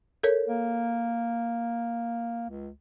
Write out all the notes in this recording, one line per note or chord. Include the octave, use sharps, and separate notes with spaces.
A4 A#4 C#5
A#3
C#2